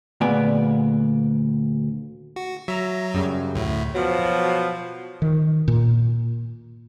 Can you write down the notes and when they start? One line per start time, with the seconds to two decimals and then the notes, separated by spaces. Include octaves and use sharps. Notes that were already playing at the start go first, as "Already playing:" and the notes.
0.21 D2 A#2 G#3 B3 D5 G#5
2.36 F#4
2.68 F#3 E5 A#5
3.14 F#2 C#3 G3
3.55 D2 A2
3.95 B2 F3 F#3
5.22 D#3
5.68 A#2